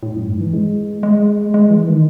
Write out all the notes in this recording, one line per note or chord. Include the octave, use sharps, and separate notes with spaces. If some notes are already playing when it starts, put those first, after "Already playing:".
A2
F#2
G#2
E3
G#3
G#3
G#3
E3
D#3